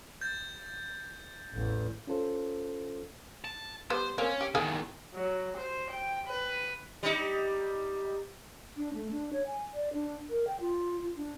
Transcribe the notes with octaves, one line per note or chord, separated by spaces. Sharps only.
G6 A6
A1 E2
C#4 F4 A4 C5
A5
G3 B3 C5
A#3 C4 C#4
G4
E2 D#3 G#4 G#5
F#3
C5
G5
B4
G3 D#4
D4
A3
D4
C#5
G#5
D5
D4
A#4
G5
F4
F4
D4